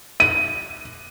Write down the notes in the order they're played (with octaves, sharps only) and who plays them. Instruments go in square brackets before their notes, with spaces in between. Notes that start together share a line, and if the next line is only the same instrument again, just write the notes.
[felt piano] D#7